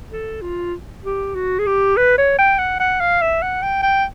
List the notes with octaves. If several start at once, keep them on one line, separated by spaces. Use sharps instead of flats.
A4
F4
G4
F#4
G#4
G4
B4
C#5
G5
F#5
F#5
F5
E5
F#5
G5
G5